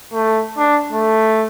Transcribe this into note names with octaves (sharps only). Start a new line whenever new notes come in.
A3
D4
A3